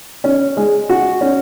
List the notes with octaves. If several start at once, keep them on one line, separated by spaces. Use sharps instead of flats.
C#4
G#3
F#4
C#4